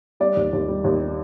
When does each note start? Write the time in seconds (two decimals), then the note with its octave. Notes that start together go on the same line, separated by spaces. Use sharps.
0.20 G3 D5
0.36 D#2
0.53 D#2
0.68 G3
0.84 D#2